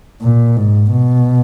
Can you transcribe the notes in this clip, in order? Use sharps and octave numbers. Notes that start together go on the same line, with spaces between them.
A#2
G#2
B2